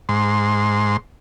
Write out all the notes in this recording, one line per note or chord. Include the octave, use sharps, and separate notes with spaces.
G#2 C6